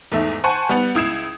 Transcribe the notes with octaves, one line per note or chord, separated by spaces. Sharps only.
E2 G#2 A3 E5
C5 F#5 G#5 A5 C6 C#6
G3 B3 F#5 F7
C#2 E4 D#6 G#6 C7 E7